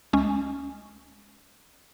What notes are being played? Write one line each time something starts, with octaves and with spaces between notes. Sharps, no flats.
C#2 G#3 C#4